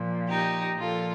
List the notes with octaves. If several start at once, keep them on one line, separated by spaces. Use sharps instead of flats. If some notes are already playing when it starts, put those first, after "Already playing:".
Already playing: A#2 F3
D#4 G4
A#2 F3 F4 A4